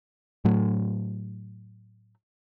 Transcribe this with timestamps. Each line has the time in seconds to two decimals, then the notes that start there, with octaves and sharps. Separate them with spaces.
0.45 A2 F#3 A3